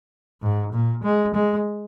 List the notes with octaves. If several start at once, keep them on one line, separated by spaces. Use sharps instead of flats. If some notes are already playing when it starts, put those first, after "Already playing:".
G#2
A#2
G#3
G#3